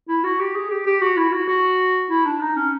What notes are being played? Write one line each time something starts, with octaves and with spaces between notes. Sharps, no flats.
E4
F#4
G4
G#4
G4
G4
F#4
E4
F#4
F#4
E4
D4
D#4
C#4